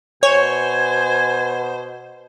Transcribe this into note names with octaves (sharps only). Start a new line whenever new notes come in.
B2 C5 C#5 G#5